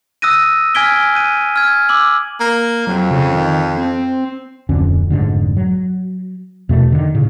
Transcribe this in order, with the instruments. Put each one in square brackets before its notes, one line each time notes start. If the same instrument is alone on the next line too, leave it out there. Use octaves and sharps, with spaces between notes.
[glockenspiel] D#6 E6 F#6 A#6 D#7
G#5 F6 G#6 B6 D7 G7
F#6 D#7
F6 G#6
D6 E6 F#7
[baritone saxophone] A#3
[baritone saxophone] F2 [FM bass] F#3
[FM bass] C#3
D#3
C4
[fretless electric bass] D1 F2 D3 C#4
F1 B1 G#2 D3
F#3
E2 B2 A3
D3 D#3
A2 C#3